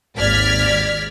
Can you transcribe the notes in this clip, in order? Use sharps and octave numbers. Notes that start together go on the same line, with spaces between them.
G#1 D#2 D5 F6 G#6 B6